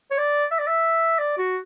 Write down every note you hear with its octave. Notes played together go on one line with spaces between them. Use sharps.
C#5
D5
E5
D5
E5
D5
F#4